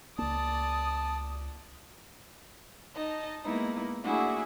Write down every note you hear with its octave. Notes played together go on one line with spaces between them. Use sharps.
C#2 A#3 D5 A5 D#6
D#4 D#5 A5
G#3 A#3 B3 D#4 E4
A3 A#3 D4 E4 F#4 G#4